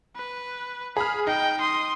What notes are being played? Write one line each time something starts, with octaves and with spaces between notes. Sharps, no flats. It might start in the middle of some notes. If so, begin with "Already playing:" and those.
B4
G#4 B5 F6
D#4 G5
C6 D#6